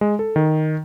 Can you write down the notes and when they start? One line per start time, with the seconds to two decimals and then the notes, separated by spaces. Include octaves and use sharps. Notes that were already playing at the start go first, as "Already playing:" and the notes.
0.01 G#3
0.19 A4
0.36 D#3